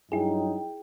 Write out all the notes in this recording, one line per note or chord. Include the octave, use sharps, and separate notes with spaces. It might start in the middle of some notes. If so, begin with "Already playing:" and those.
G2 F#3 D#4 E4 G#4 G5